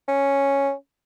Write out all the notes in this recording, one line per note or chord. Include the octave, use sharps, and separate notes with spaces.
C#4